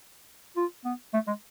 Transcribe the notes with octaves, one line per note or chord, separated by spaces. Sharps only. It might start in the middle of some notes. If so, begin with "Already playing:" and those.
F4
B3
A3
G#3